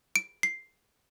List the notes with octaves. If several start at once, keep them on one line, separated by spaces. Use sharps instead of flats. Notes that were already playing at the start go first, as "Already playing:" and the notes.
D7
C7